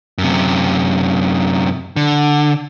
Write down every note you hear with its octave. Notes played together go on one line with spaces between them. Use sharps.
F#2 C3
D3